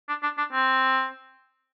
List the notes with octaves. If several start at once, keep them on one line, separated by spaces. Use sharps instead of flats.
D4
D4
D4
C4